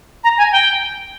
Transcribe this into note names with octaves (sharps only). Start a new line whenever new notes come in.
A#5
G#5
G5